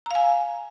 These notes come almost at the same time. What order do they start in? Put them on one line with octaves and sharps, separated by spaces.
A#5 F5 G#5